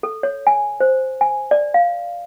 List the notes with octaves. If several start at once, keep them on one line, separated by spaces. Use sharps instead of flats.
A4
C#5
G#5
C5
G#5
D5
F5